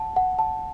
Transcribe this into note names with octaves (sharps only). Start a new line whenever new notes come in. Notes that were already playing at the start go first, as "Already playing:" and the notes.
Already playing: F#5 A5
F#5
A5